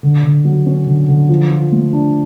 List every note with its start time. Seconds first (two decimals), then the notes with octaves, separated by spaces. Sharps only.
0.03 D3
0.24 D3
0.45 F#3
0.66 C#4
0.87 D3
1.08 D3
1.29 F3
1.51 F4
1.72 A3
1.93 D4